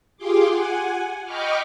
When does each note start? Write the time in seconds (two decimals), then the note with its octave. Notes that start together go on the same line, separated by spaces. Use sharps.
0.17 F4 G4 G#4 C6 D6
0.49 F#5 G#5
1.24 D#5 G5 B5 C#6 D6 F6